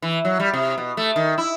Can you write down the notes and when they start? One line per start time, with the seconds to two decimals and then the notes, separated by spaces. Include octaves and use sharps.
0.02 E3
0.25 F#3
0.40 G3
0.54 C3
0.78 B2
0.97 A3
1.16 D#3
1.38 E4